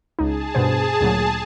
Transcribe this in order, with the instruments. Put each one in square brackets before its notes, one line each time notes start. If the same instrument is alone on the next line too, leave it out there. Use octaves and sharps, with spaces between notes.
[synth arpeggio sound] C#2 D#4 [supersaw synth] G#4 A5
[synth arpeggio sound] G2 B2 C5
D2 A#2 F#3